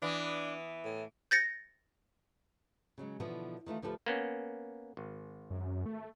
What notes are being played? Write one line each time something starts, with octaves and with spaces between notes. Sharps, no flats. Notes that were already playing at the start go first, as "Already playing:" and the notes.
E3 B3 D4
A2
G6 A6 A#6 C#7
C#3 F#3 G#3
B2 D3 E3 F3 B3
D#3 E3 A3 F4
D2 F3 G4 A4 B4
A#3 B3 C#4
G#1
F#2
A3